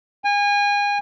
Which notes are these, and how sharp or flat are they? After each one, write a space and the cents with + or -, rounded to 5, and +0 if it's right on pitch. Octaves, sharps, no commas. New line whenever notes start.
G#5 -30